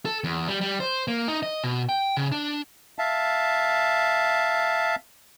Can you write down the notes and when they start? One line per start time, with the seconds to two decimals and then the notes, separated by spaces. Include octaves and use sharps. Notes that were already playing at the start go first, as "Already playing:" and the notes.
0.05 A4
0.24 E2
0.48 G3
0.61 G3
0.80 C5
1.08 A#3
1.28 D#4
1.43 D#5
1.64 B2
1.89 G5
2.17 C#3
2.32 D4
2.99 E5 F5 A5